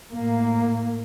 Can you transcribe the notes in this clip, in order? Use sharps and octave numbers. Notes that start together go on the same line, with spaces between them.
A2 A#3